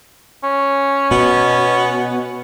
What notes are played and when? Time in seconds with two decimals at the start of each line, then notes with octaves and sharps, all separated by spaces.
0.44 C#4
1.11 B2 B3